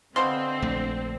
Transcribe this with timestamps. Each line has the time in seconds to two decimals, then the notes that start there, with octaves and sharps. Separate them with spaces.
0.16 B2 D3 C4 C5 F5 C6
0.62 A#1 A3